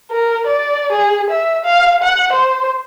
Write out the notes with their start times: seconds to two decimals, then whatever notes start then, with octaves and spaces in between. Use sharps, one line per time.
0.12 A#4
0.47 D5
0.92 G#4
1.30 E5
1.64 F5
2.03 F#5
2.32 C5